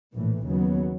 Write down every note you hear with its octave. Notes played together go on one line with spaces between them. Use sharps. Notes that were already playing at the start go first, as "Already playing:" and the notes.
A#1 A2 E3
D#2 C#3 F#3 B3